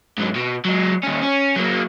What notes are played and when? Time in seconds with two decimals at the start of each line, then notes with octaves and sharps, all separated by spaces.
0.18 G#2 F#3
0.35 B2
0.65 F#3 G#3
1.03 D#2 C#4
1.22 C#4
1.56 F#3 A#3